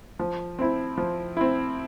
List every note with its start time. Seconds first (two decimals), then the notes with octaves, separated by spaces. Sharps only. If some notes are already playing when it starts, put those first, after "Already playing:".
0.19 F3
0.59 C4 E4
0.98 F3
1.37 C4 E4